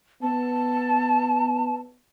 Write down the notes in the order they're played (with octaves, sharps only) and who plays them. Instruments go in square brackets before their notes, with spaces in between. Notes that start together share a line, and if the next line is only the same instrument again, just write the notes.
[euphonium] B3 [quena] A5